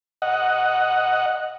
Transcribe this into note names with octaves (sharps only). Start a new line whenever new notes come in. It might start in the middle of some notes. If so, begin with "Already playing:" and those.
D#5 F#5